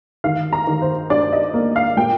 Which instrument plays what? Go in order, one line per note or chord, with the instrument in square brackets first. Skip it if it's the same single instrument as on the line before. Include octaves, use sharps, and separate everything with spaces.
[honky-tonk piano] D#3 F5
A#5
D#3
C5
D4 D5
D#5
A#3
F5
A#2 G5